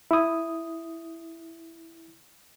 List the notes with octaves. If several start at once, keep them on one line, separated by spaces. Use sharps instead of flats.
E4 D#6